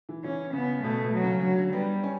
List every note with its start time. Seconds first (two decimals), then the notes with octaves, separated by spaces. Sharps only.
0.09 E3
0.24 E3 C#4
0.53 C#3 B3
0.83 B2 A3
1.04 B2
1.14 F#3
1.23 C#3
1.43 D3 F#3
1.58 D3
1.73 G3 B3
2.03 C#4